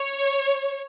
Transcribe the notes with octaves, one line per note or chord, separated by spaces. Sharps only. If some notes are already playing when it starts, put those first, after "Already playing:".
Already playing: C#5